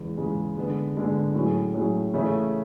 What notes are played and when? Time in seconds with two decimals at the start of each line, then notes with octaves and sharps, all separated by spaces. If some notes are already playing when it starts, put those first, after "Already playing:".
Already playing: E2 C#3 G#3
0.17 E2 C#3 G#3
0.56 D3 G#3 B3
0.95 D3 G#3 B3
1.34 A2 F#3 C#4 G#4
1.74 A2 F#3 C#4 G#4
2.13 C#3 E3 A3 C#4 G#4